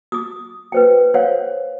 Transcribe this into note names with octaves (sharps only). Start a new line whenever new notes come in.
D6 D#6
B4 C5 G5
C5 C#5 F5 F#5